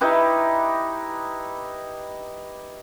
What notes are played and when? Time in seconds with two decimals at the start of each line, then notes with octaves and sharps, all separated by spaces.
0.01 D#4 E4 G4 B4